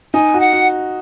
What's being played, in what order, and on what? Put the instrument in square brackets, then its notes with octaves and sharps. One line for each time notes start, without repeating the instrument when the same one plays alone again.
[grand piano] D#4 [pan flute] G#5
[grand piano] F#4
[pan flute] F#5
[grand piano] F#4